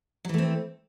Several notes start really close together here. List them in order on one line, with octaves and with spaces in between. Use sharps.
F#3 E3 A3 C4